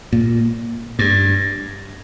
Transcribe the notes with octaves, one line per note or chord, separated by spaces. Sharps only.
A#2
G2